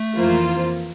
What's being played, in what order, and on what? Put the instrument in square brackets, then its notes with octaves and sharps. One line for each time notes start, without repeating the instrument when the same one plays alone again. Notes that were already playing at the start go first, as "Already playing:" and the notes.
Already playing: [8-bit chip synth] A3
[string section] F2 E3 A#3 F4 C5